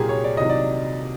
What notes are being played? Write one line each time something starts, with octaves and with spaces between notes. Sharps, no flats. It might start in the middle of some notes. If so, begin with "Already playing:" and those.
Already playing: C2 A#2 F#3 A#3 G4 G#4
C#5
D5
C2 C3 D#3 F#3 D#5
D5